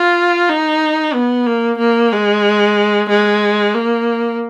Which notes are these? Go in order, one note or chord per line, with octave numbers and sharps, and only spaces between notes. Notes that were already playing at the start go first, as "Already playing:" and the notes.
Already playing: F4
D#4
B3
A#3
A#3
G#3
G#3
A#3